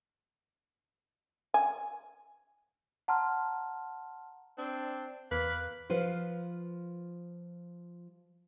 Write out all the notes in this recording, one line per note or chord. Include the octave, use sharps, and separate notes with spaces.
G#5
F#5 A5 A#5 C6 F6
C4 D4
E2 A#3 B4
F3 F4 B4 C5